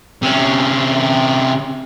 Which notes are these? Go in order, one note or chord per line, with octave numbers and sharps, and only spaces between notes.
C3 C#4